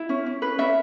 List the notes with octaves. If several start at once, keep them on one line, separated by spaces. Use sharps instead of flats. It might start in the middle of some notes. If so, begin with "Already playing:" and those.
Already playing: E4
C#4
C#4
B4
C#4 E5